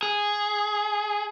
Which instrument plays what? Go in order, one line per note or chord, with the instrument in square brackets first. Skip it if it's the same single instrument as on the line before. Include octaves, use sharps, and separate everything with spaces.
[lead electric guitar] G#4